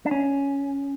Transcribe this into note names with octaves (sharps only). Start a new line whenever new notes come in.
D4
C#4